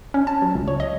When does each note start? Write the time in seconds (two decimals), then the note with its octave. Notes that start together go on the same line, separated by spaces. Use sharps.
0.14 C#4
0.27 A5
0.42 F#3
0.55 C#2
0.68 C#5
0.80 D#5